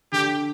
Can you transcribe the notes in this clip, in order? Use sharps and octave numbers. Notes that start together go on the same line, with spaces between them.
D3 G4